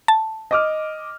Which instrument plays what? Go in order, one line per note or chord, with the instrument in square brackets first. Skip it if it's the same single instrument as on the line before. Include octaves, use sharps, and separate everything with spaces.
[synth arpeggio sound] A5
[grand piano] D#5 D6 F6